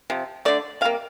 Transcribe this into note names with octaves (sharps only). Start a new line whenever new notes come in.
C3 F3
D3 A3 D5
C3 G3 A#3 F5